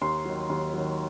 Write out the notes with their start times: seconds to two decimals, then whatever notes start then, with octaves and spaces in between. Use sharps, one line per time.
0.01 D#2 C6
0.25 D#3 F#3
0.50 D#2
0.73 D#3 F#3